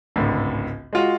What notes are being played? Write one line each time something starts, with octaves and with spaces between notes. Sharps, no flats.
G#1 C#2 A2 D3
G#3 F4 F#4